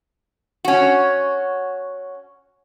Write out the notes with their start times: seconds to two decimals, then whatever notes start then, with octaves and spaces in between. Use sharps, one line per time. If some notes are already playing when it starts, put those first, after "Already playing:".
0.65 C#4 F#4